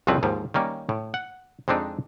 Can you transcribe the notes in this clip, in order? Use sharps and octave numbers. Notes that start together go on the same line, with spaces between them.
C2 F2 C#3 F3 C4 B4
D#2 G#2 F3
D#3 G3 A#3 C#4
A2
F#5
F2 G#3 C4 D4 D#4